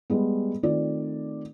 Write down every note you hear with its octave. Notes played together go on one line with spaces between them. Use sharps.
G3 G#3 B3
D#3 A3 C4 F4 D5